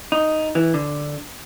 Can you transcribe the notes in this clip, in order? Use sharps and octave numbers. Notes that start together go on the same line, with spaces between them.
D#4
E3
D3